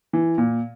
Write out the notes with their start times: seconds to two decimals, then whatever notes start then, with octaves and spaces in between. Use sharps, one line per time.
0.13 E3
0.38 A#2